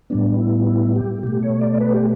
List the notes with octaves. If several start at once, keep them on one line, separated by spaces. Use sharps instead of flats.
A2 G3 B3 D4
E4
E4
G4
B2 A3 G4
C#5
D5
B4
G4